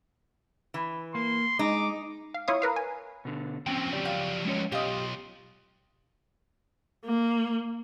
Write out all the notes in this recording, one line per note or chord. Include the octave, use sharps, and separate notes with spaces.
E3
A#3 C6
G#3 D#4 D6
F5
E4 F4 C#5 F5 D#6
A#4 B4 F5
G#5
B2 D3
F3 F#3 C4 C#4 G5
C#3 G4 D5
F5 G5
G#3 C#4 C#5
B1 F4 G4 D#5
A#3